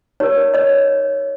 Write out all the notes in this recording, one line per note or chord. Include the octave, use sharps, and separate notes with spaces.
D#4 G4 A#4 C#5
C#5 D#5